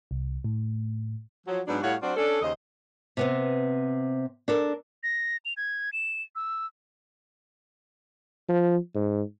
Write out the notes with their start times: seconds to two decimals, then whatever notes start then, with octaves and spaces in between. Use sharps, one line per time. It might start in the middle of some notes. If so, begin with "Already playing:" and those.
0.11 C2
0.44 A2
1.47 F3 F#3
1.68 G#2 F#3 B3 D4
1.83 A2 G3 F#4 C#5 F5 F#5
2.02 F#3 C4 D4 F4 F#4 C5
2.17 C#4 D4 A4
2.42 D#2 C#3 C5 D#5
3.17 C3 B3 C4
4.48 D4 A4 A#4
5.03 A#6
5.45 F7
5.57 G#6
5.93 E7
6.36 E6
8.48 F3
8.94 G#2